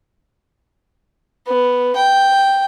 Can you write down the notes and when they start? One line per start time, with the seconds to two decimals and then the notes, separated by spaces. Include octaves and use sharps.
1.47 B3
1.96 G5